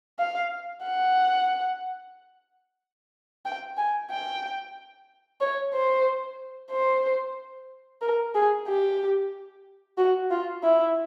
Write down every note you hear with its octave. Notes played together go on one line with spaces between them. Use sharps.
F5
F#5
G5
G#5
G5
C#5
C5
C5
A#4
G#4
G4
F#4
F4
E4